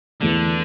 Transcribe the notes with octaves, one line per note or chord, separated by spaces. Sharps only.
E2 D3 E3 A3